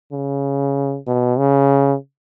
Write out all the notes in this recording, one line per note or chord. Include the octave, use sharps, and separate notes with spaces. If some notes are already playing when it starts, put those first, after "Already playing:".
C#3
B2
C#3